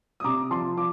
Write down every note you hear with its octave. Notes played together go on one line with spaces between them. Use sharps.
D#6
C3 A#5 D6
F3 A5 C6
F3 D6